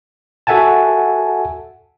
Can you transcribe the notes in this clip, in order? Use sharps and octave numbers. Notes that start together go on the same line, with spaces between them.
F#4 A4 E5 F#5 G#5 A5